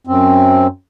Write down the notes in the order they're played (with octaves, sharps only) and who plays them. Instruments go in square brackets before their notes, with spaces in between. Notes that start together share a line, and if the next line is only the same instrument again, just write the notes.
[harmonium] F#2 C4